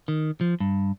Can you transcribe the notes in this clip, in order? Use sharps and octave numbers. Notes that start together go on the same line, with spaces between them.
D#3
F3
G2